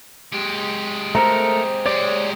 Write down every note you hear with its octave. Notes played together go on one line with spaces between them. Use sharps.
G#3 G4
A3 A4 A#4 C5 A#5
G#3 G4 C#5 D5 D6